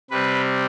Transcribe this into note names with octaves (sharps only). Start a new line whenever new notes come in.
C3 G3 C4 B4